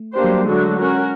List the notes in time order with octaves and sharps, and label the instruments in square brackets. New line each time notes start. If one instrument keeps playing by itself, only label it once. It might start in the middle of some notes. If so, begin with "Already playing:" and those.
Already playing: [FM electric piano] A3
[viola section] A#3 D4 G4 C5
[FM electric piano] F#3
G3
[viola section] D3 F#3 A3 D4 F#4 [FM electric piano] G#3
[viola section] C#4 F#4 A#4